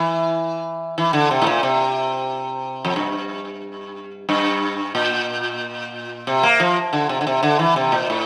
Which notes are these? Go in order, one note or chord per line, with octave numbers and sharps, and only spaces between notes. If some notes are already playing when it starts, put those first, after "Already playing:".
Already playing: E3
E3
D3
C3
A2
A#2
C3
F2
G2
G2
A#2
C3
A#3
F3
D3
C3
D3
C3
D3
E3
C3
A#2
A2